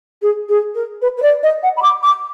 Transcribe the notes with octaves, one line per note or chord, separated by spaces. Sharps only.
G#4
G#4
A#4
B4
B4
D5
D#5
F#5
B5
D6
D6